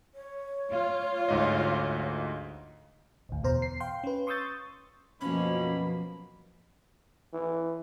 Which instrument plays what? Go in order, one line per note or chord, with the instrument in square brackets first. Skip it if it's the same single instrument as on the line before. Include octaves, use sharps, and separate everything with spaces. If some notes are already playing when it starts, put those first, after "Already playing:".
[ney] C#5
[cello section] F4
[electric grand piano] D2 G#2 D#5
[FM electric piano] A1 D2
E2 B2 C5 A#5
C7
F5 G5 C6
C#4 B4
C6 C#6 D#6 E6 G6 A6
[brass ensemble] F#2 B2 [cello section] F3 A#3 [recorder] C#4 [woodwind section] B5
[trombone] E3